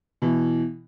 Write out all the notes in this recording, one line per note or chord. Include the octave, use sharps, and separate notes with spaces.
B2 E3